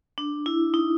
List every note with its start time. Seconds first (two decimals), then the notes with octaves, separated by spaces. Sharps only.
0.18 D4
0.46 E4
0.74 D#4